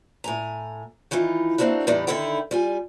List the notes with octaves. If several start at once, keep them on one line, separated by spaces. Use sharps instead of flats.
A2 G#5 A#5
D#3 E3 D#4 F4
A3 A#3 C4 D4 D#4 F#4
E2 A2 E3 G3 D#4 D5
D3 D#3 D#4 E4 A4 G5
G3 F4 G#5